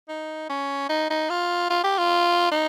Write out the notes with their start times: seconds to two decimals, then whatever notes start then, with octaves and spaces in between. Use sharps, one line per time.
0.08 D#4
0.49 C#4
0.89 D#4
1.10 D#4
1.30 F4
1.70 F4
1.84 G4
1.98 F4
2.51 D#4